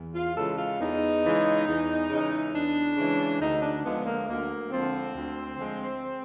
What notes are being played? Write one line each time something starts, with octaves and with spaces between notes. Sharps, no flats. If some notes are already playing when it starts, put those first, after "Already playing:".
Already playing: E2
F4
C#3 E3 G#3 A4
F4
E2 D#4
C#3 E3 G#3
E2
C#3 E3 G#3
E2 D4
C#3 E3 G#3
D2 D#4
D4
D3 F3 G#3 B3
A#3
D2 A#3
D3 F3 G#3 C4
D2
D3 F3 G#3